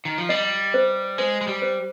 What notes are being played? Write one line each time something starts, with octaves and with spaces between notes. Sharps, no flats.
D#3
F3
G3 D#5
C5
G#3 C5
G#3
G3
C5